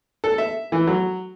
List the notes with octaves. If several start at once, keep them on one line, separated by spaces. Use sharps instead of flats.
A4
E5
E3
F#3